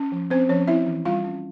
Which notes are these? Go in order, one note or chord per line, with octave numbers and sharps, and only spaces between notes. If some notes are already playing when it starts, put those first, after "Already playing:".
Already playing: C#4
F3
C4 C#4 C5
F3 C#4 C#5
C4 E4 E5
E3
G3 F4 F5
C#4